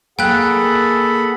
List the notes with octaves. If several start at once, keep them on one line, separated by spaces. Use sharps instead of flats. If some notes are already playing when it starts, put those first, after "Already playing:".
A#3 G#4 A4 F#5 G5 B5 F#6